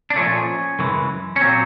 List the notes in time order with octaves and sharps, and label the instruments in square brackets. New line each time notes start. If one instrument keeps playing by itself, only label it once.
[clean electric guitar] D4
A#2 F3 A3 C#4
F#2 C#3 E3 G#3
C#4
A#2 F#3 C4